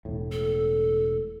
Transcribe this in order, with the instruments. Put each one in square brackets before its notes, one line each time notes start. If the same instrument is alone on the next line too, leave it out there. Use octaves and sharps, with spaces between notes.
[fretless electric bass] E1 A2
[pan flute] A4